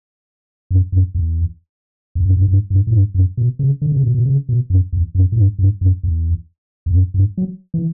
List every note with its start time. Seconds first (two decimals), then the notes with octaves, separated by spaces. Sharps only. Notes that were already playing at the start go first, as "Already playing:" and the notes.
0.71 F#2
0.92 F#2
1.15 E2
2.15 E2
2.25 F#2
2.37 G2
2.48 G2
2.70 G2
2.87 A2
2.93 G2
3.14 F#2
3.37 B2
3.59 C#3
3.82 D3
3.92 C#3
4.03 B2
4.14 B2
4.25 C#3
4.49 B2
4.70 F#2
4.93 E2
5.15 F#2
5.32 A2
5.37 G2
5.59 G2
5.81 F#2
6.03 E2
6.86 E2
6.92 F#2
7.14 G2
7.38 F#3
7.74 E3